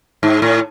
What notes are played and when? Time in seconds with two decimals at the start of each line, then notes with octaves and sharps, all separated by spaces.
0.23 G#2
0.42 A2